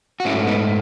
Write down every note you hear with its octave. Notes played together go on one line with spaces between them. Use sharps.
F#4
G#2 F#3 A3 C#4 E4
B3 D#4